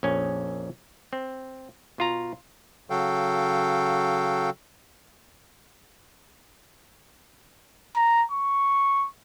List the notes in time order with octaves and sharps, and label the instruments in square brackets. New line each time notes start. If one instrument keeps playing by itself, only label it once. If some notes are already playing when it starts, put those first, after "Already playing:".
[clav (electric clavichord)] A#1 F2 C#4 G#5
C4
B2 F4 A#5
[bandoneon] C#3 F#3 F#4 A4 F5 G5
[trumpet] A#5
C#6